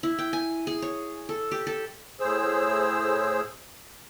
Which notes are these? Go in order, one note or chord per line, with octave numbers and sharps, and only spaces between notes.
E4
G5
G#5
G#4
C#5
A4
G4
A4
A2 G#4 C5 E6